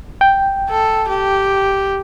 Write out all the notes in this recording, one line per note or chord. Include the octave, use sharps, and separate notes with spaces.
G5
A4
G4